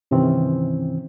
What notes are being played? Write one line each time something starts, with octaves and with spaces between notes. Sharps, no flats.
G2 C3 D#3 E3 C4 C#4